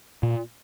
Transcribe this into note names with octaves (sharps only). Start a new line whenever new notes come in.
A#2